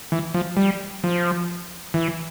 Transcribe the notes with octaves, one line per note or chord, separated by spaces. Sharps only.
E3
F3
G3
F3
E3